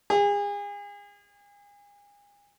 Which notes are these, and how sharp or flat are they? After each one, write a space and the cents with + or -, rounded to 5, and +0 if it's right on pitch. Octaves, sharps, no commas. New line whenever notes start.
G#4 -35